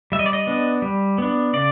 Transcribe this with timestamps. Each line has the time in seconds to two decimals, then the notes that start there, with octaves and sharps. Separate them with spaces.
0.12 G3 E5
0.19 D#5
0.26 D5
0.33 D#5
0.47 B3 D4
0.82 G3
1.18 B3 D4
1.53 C#3 D5